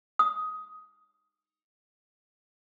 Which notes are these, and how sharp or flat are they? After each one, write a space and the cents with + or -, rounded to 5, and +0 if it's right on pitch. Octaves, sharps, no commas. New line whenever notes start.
D#6 +15